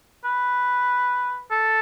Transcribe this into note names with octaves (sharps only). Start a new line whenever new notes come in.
B4
A4